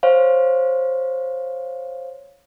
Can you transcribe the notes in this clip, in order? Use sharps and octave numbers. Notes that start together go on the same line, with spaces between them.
C5 C#5 F5